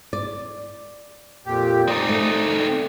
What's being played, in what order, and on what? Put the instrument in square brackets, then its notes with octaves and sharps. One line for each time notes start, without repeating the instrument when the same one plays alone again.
[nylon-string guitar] D5
[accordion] F2 A#2 G4
[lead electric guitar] C4 D#4 [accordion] D5 D#6
[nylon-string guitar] A3